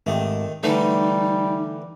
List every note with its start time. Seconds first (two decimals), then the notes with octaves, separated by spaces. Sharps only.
0.06 G#1 D#3 A3 G4
0.63 D3 E3 G3 A3 D#4